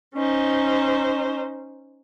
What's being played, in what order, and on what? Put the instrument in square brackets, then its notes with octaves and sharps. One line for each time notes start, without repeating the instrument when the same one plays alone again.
[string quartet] C#4 D#4 C5